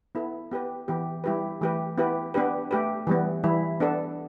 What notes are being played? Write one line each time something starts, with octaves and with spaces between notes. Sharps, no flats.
B3 E4 A4
B3 G4 B4
E3 B3 G4
G3 E4 G4 B4
E3 A3 G4 B4
B3 E4 G4 B4
B3 D4 G4 B4
A3 G4 B4
E3 G3 B3
E3 G3 E4
B3 D4 A4